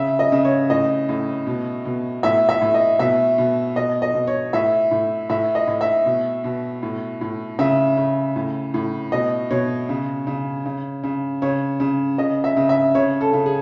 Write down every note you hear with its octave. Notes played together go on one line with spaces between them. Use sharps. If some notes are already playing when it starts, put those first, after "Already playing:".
Already playing: C#3 E5
D#5
C#3
C#5
A2 D#5
A2
B2
B2
A2 E5
E5
A2
D#5
B2 E5
B2
B2 D#5
D#5
B2
C#5
A2 E5
A2
A2 E5
D#5
A2
E5
B2
B2
A2
A2
C#3 E5
C#3
A2
A2
B2 D#5
B2 C#5
C#3
C#3
C#3
C#3
C#3 C#5
C#3
C#3 D#5
E5
C#3
E5
C#3 C#5
A4
C#3
G#4